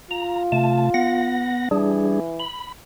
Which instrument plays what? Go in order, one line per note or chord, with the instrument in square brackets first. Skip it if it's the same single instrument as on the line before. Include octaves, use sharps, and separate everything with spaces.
[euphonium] F4 [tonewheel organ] A#5
[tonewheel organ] C3 A3 A5
B3 F#5 A#6
[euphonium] E3 [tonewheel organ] G3 D4 G#4
[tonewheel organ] B5